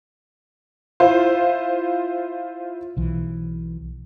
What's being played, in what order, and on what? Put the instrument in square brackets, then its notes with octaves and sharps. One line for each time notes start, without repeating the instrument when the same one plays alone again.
[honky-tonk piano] E4 F4 C5
[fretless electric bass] B1 E3